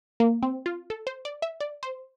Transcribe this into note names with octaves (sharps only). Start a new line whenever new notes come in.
A#3
C4
F4
A4
C5
D5
E5
D5
C5